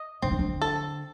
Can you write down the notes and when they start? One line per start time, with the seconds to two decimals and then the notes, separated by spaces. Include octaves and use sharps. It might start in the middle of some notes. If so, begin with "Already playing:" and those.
Already playing: D#5
0.22 D3 C4
0.31 D#3
0.39 D3
0.62 A4